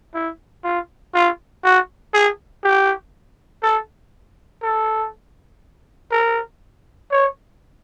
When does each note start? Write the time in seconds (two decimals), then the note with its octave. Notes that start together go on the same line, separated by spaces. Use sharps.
0.14 E4
0.64 F4
1.14 F4
1.64 F#4
2.13 G#4
2.64 G4
3.63 A4
4.62 A4
6.11 A#4
7.11 C#5